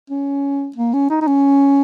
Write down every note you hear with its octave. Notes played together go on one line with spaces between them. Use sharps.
C#4
A#3
C#4
D#4
D#4
C#4